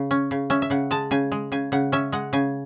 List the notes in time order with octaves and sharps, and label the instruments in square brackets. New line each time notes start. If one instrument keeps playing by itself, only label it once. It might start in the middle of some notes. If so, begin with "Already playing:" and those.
Already playing: [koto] C#3
C#4
C#3
C#4 E5
E5
C#3 F#5
G#3 A5
C#3 G#5
G#3
C#3 G#5
C#3 F#5
C#4 E5
G#3 F#5
C#3 G#5